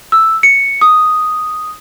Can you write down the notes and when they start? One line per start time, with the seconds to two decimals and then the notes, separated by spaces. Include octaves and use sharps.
0.12 E6
0.43 C#7
0.81 D#6